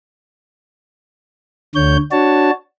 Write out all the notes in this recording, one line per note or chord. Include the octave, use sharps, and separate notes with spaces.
D2 D3 C#5 G6
D4 F#4 C#5 A5